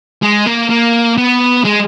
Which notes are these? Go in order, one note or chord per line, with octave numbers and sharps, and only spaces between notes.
G#3
A#3
A#3
B3
G#3